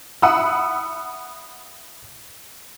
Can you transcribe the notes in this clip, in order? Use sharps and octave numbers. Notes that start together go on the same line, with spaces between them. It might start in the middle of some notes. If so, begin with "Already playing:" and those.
E5 F#5 B5 D#6 E6